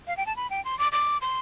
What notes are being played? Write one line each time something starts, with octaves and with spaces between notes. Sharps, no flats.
F5
G5
A5
B5
G5
C6
D6
D6
C6